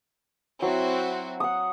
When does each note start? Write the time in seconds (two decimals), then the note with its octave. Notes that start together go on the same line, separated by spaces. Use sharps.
0.62 F#3 C4 E4 F#4
1.40 F#5 D#6